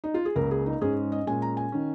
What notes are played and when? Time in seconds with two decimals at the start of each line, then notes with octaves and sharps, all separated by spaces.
0.04 D#4
0.14 F4
0.25 G#4
0.36 C#2 C#3 A#3 A#4
0.51 G#4
0.66 D#4
0.81 G#2 G#3 C#4 G#4
1.12 D#5
1.27 A#2 G#3 C#4 G#5
1.42 A#5
1.57 G#5
1.72 D#3 C#4